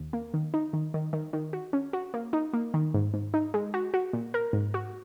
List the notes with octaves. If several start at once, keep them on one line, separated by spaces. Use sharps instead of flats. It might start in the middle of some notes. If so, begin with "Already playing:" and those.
Already playing: D#2
A#3
D#3
D#4
D#3
D#3
D#3
D#3
F#4
C#4
F#4
A#3
D#4
A#3
D#3
G#2
G#2
D#4
G#3
F#4
F#4
A#2
A#4
G#2
F#4